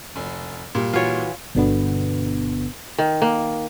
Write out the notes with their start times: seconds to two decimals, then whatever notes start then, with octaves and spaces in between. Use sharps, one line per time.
0.16 F1
0.75 A#2 G3
0.93 E3 F4 F#4 C#5
1.55 G1 B2 D3 B3
2.98 D#3
3.22 A#3